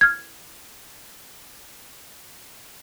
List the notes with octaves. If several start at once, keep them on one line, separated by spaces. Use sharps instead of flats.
F6 G#6